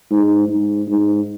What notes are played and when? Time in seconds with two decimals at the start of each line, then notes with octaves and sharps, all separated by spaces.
0.11 G#2
0.49 G#2
0.88 G#2